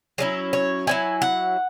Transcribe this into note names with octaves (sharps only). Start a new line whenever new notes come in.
F#3 C#4 E4 G#4
C#5
F#3 C#4 E4 G#5
F#5